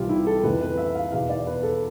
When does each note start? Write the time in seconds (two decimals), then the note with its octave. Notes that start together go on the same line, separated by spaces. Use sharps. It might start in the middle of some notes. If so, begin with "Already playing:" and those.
Already playing: C2 C3 E3 G3 F4 G4
0.09 E4
0.27 A4
0.43 F2 C3 E3 A3 B4
0.61 B4
0.78 E5
0.95 F5
1.12 E2 B2 B3 F5
1.29 D5
1.47 B4
1.63 A4